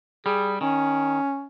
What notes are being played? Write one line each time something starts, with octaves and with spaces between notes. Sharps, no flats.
G3 G#4
D#3 C#4